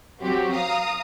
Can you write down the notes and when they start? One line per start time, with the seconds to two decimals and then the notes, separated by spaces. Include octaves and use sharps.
0.21 F#3 C4 F#4 G4
0.52 F5 A#5 D#6